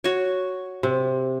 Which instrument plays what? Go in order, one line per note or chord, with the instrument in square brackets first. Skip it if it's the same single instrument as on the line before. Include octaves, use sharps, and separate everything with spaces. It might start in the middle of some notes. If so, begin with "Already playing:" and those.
[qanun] F#4 C#5
[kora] C3